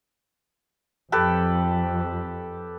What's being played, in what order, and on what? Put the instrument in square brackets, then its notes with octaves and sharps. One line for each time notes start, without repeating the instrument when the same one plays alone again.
[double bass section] F2 [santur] G4 A4 B4